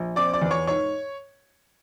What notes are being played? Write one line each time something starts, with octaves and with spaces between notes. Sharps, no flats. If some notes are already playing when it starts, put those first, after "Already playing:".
Already playing: A#1
C4 D5 D6
D5 D6
E2
C#5 C#6
G#2 C#5 C#6